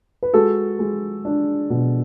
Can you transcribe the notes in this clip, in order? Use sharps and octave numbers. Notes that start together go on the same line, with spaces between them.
B4
G#3 F#4 A4
G#3
D4
B2